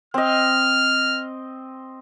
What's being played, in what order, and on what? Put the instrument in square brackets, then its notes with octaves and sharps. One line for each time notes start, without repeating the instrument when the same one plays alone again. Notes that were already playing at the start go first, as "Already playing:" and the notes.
[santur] C4 D#5 [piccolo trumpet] F6